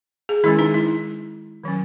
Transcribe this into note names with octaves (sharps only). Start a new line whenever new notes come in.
G#4
D#3 G#3 C#4 E4
D#4
E4
D#3 F#3 C#4